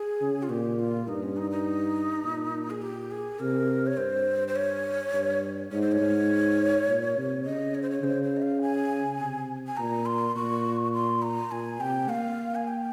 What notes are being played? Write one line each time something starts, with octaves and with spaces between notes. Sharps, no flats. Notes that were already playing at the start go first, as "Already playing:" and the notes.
Already playing: G#4
C#3
F4
A#2 G4
F4
G2 D#4
C#4
D#4
D#4
A#2
G#4
G4
G#4
C3 A#4
C#5
G2 C5
C5
C#5
G2
G#2 C#5
C5
C#5
G#2
A#2
C3
C#3 D#5
C#5
C5
C#5
C#3 C5
C5
D#5
F5
G#5
C3
G#5
A#2 A#5
C6
A#2 C#6
C6
A#5
A#2 G#5
C3 G5
A#3 F5
G#5
G5